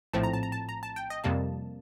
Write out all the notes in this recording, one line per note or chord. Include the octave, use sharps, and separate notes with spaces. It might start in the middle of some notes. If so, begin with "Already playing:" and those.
A#1 A2 F3 A3 C4 A5
A#5
A5
A#5
A5
A#5
A5
G5
D#5
F2 C3 G3 A#3 A5